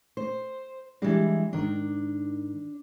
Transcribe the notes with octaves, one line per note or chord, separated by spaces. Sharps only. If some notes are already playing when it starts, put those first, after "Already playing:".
C5
E3 G3 G#3 D4
G#2 D#3 D4